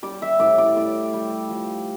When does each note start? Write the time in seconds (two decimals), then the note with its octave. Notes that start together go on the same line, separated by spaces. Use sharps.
0.03 G3 D5
0.22 E5
0.40 A2 D5
0.58 D5
0.76 A2 D5
1.13 G3
1.49 F3